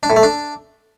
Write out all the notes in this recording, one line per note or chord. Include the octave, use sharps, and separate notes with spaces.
D4
A2
A3
D4